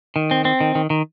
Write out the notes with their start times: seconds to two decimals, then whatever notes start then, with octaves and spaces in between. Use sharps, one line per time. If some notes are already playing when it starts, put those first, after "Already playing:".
0.16 D#3
0.31 C4
0.45 C4
0.61 D#3
0.75 D#3
0.90 D#3